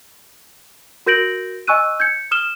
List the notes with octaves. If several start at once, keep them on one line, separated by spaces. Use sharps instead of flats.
F#4 A#4 G6 A#6 D7 F#7
D#5 G#5 C#6 E6 F#6 D#7
G6 G#6 C#7
D#6 F6 E7 G7